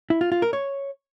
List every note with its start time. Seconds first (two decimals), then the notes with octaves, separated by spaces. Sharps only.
0.10 E4
0.21 F4
0.32 F4
0.42 A#4
0.53 C#5